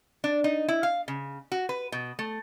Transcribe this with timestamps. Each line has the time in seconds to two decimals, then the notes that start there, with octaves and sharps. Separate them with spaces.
0.24 D4
0.44 D#4
0.68 E4
0.83 F5
1.08 C#3
1.52 F#4
1.69 B4
1.92 B2
2.19 A3